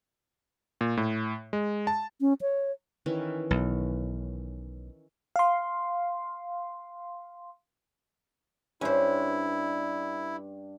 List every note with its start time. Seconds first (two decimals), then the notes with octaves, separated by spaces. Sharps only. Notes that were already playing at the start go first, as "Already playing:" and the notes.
0.81 A#2
0.97 A2
1.53 G#3
1.87 A5
2.21 C#4
2.41 C#5
3.06 D#3 E3 C#4
3.51 B1
5.36 F5 C6
8.81 G2 C#4 E4 C5